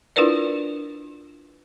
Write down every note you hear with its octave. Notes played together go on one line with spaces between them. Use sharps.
D4 E4 F4 A#4 B4 D5